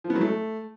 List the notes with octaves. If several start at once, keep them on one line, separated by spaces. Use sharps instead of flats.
F3
B3
F#3
A3